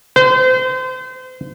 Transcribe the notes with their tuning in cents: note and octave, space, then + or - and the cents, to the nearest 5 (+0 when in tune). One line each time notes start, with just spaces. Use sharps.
C5 -35